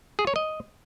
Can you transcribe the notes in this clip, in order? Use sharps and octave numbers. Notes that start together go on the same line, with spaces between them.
G#4
C#5
D#5